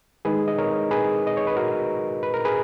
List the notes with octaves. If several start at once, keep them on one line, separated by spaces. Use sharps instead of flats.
D#3 G#3 D#4 G#4 B4
D#5
A#4 C#5
G#4 B4
D#5
C#5
B4
F#4 A#4
B4
A#4
G#4 B4